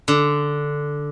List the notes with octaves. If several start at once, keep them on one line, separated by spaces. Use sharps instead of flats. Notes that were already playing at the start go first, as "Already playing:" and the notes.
D3